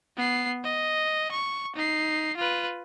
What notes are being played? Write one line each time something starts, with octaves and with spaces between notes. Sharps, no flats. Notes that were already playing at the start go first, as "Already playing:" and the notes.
B3 C7
D#5
C#6
D#4 C7
F4 B4